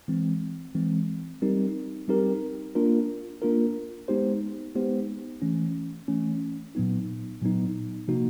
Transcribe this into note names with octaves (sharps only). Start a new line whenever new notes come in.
E3 G#3 C4
E3 G#3 C4
G3 C4 D#4 G4 A#4
G3 C4 D#4 G4 A#4
A#3 D4 F4 A#4
A#3 D4 F4 A#4
G#3 B3 D#4 G4 C5
G#3 B3 D#4 G4 C5
E3 A3 C#4
E3 A3 C#4
A#2 F#3 B3 D#4
A#2 F#3 B3 D#4
C3 F3 A#3 D#4 F#4